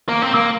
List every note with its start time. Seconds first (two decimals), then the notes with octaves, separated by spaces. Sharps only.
0.08 A#3
0.22 C4
0.35 A#3